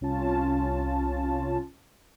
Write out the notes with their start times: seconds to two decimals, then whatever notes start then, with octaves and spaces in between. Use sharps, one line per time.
0.01 C2 C#4 F4 A5